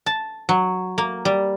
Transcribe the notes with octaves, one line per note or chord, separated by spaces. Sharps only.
A5
F#3
A#3
G3